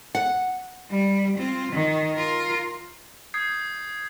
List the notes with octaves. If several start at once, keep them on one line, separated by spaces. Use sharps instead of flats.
F#5
G3
C4 F4
D#3
F4 A#4
D#6 G6 G#6 C7